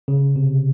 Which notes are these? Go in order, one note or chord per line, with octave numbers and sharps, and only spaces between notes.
C#3
C3